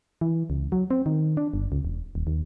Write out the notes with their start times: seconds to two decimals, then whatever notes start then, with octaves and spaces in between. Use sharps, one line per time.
0.21 E3
0.50 C#2
0.72 F#3
0.91 C4
1.06 D#3
1.37 D4
1.54 G1
1.72 C#2
1.85 E1
2.15 D#1
2.27 D#2